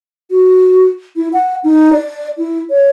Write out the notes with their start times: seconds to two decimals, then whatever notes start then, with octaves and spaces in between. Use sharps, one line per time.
0.31 F#4
1.16 E4
1.33 F#5
1.64 D#4
1.93 D5
2.38 E4
2.70 C#5